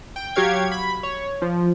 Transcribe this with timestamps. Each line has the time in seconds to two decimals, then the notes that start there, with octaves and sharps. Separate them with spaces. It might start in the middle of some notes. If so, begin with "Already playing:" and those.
0.16 G5
0.36 F#3 G4 C#5 F5 G#6
0.72 B5
1.03 C#5
1.42 F3